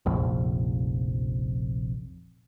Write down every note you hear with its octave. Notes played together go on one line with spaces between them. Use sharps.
F1 A#1 F2